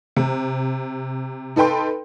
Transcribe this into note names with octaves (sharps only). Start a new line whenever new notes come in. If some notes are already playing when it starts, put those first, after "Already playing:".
C3
D#4 A4 B4 G5 C6